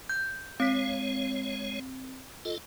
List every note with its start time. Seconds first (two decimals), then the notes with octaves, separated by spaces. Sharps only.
0.10 G6
0.60 G#3 C4 C#5 B6
2.45 F4 A4 D#5